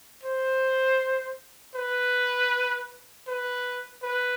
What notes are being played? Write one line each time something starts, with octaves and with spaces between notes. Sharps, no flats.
C5
B4
B4
B4